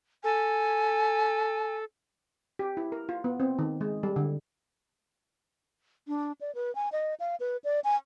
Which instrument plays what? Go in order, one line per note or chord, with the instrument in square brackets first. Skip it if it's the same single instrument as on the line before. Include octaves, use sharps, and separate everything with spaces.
[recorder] A4 [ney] G#5
[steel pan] G4
E4
A#4
F4
B3
C4
D#3
G#3
G3
D3
[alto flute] D4
D5
B4
G#5
D#5
F5
B4
D5
G#5